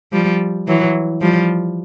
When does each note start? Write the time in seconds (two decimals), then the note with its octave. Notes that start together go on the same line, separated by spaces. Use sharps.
0.12 F3 G3
0.67 E3 F#3
1.21 F3 G3